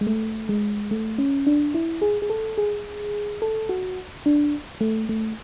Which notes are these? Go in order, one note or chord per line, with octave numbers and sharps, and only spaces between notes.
G#3
A3
G#3
A3
C#4
D4
E4
G#4
G#4
A4
G#4
A4
F#4
D4
A3
A3